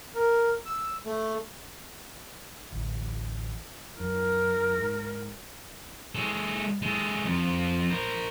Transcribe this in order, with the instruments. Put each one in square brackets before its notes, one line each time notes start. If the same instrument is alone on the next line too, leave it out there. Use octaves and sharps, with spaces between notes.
[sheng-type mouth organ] A#4
E6
A3
[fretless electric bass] A1 D2
[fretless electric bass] F#2 [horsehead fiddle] A#4
[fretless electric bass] G#2
[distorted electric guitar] G#3 A4
G#3 A4
F2
A#4 C5